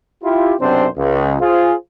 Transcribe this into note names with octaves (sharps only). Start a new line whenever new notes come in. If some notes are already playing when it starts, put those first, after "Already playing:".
E4 F4 G4
B1 F#2 C3 C4 D4 C5
C#2
F4 G#4 C5